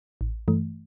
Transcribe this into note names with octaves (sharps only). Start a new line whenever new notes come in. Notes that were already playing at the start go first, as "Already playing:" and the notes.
A1
G2 E3 A3